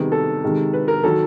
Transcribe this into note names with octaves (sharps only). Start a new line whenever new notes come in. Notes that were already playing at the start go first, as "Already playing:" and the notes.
Already playing: C3 D#3 G3 B3 G#4
A4
C3 D#3 G#3
B4
A#4
D#3 F#3 A4